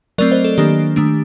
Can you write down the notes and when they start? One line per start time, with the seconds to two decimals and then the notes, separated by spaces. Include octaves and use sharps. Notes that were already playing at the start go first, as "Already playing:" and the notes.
0.18 F#3 A3 C4 A#4 D5
0.32 C5 D#5
0.44 A4
0.58 D#3 F#3 A#3 D4 G4
0.96 D#3 A3 D4